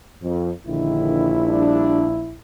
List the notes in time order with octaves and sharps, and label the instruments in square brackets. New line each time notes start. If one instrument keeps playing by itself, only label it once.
[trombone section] F2
[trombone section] A#1 E4 [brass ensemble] D3 D#3
[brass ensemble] G3 D4